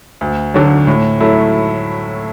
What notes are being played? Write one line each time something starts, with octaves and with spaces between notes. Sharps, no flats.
D2
D3 F#3
A2
F#3 A3 E4